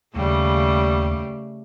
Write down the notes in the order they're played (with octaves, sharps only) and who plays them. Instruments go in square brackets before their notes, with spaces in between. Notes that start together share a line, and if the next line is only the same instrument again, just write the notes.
[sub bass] D#2 [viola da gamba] C#3 G3 A3